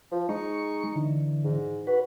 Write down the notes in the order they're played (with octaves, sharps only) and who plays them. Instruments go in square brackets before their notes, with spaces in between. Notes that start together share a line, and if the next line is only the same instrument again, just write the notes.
[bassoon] F3
[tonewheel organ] G#3 C#6 [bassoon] D#4
[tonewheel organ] D3 E3
[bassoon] G#2
[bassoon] F#4 [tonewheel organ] B4